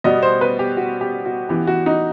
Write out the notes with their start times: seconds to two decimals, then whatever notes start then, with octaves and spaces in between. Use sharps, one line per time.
0.04 B2 G3 B3 D#5
0.23 C5
0.41 B4
0.59 G4
0.77 F#4
1.01 G4
1.26 F#4
1.49 E3 B3 G4
1.67 F#4
1.86 D#4